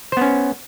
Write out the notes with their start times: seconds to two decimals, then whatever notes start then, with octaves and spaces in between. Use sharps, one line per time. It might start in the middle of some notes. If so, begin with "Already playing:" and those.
0.12 C5
0.17 B3
0.21 C#4